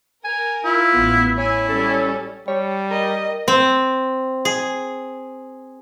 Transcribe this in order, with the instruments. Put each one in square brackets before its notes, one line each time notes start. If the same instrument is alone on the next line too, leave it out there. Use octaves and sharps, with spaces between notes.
[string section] A#4 [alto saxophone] G#5
[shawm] E4 [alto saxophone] F4
[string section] A1 B3
[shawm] E4 [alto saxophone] C#5 [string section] G#5
[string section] G3 C#4 [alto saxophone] A4
[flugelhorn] G3 [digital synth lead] C#5
[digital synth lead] A#4 [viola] D#5
[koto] C4
G#4